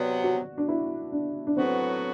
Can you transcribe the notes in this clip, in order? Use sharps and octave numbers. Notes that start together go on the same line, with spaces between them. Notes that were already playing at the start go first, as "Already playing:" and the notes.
Already playing: C3 F#3 B3 D5
F#4
D4
E4
D4
D4
A2 F#3 B3 C4 F#4 B4